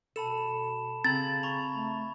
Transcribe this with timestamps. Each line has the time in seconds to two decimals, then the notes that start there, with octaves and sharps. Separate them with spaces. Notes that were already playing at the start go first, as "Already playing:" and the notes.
0.16 B2 A4 A5 B5 E7
1.04 C#3 C4 A#5 G#6 A6 F#7
1.43 A#5 B5 C#6 F7
1.74 A3